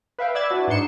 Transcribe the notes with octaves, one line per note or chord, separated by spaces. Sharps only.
B4 E5 F5 G5
D5 B5 E6 F#6 G#6 A6
D4 E4 F#4 B4
G#2 D4 D#4 C6 C#7 E7